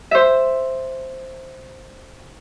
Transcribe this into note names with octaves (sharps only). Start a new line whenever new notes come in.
C5 E5